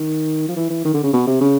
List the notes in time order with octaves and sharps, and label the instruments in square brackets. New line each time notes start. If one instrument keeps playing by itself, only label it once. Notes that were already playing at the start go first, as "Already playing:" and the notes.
Already playing: [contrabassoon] D#3
F3
E3
E3
D#3
D3
C#3
B2
C3
C#3